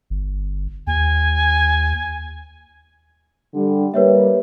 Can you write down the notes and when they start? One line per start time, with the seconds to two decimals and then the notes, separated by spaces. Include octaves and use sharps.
0.10 G1
0.87 D#2 G#5
3.54 D3 G3
3.94 G3 A#3 B4 C#5 E5